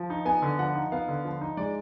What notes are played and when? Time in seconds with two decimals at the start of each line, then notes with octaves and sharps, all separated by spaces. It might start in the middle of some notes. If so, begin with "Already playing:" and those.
Already playing: F3
0.10 D#4
0.25 B3 G#5
0.42 D3
0.59 F3 F#5
0.75 D#4
0.92 B3 F5
1.08 D3
1.25 F3
1.41 D#4
1.57 G#3 D5